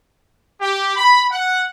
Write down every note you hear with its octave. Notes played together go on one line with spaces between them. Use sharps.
G4
B5
F#5